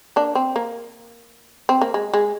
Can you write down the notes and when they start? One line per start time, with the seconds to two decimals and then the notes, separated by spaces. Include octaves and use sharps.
0.16 A#3 D4
0.35 C4
0.56 A#3
1.69 C4
1.81 A#3
1.94 G#3
2.13 G#3